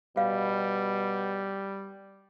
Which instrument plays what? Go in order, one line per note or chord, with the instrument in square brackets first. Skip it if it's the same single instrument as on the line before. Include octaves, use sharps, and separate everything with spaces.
[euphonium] B2 [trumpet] G3 [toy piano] F5